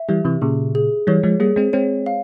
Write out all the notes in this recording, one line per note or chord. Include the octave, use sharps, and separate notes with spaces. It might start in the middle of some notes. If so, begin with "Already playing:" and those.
Already playing: E5
E3 G3 G4
C3 E3
A#2 C#3 G#4
G#4
E3 G3 C#5
F3 G#3
G3 A#3 G#4
G#3 C4
G#3 C4 C#5
F5